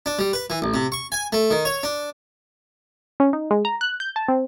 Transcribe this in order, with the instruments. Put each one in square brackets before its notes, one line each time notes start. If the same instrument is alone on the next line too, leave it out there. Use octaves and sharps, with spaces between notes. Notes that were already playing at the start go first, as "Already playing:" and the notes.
[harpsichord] D4
G3
B4
E3
A1
C3
C#6
G#5
A3
D#3
C#5
D4
[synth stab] C#4
D#4
G#3
A#5
F#6
G6
A5
C4